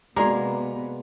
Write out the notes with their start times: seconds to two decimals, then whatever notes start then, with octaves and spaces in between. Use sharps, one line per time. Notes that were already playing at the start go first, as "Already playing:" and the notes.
0.16 C3 G#3 A#3 B3 F#4 D5 A#5 D6